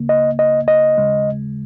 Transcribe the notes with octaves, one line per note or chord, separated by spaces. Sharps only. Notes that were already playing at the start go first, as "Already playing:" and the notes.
Already playing: C#2 C#3 A#3
D#5
D#5
D#5
D#2 C#3 G#3